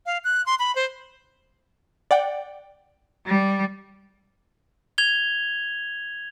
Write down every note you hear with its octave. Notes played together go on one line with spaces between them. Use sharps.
F5
F#6
C6
B5
C5
D5 F#5 G5
G3
G#6 F7 G7